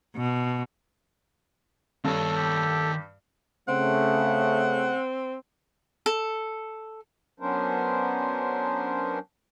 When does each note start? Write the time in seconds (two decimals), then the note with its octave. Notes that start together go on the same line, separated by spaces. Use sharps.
0.16 B2
2.04 G2 D#3 A4 C#5
2.36 G4
3.68 C#3 A3 C4 F#5
6.06 A4
7.40 F#3 B3 C#4 D4 A#4 C5